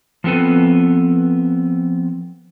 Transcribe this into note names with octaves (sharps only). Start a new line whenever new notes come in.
F3 B3 C4 A4 B4